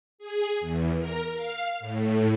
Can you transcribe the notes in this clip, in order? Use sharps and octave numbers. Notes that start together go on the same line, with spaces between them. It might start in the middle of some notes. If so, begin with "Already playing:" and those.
G#4
E2
A#4
F5
A2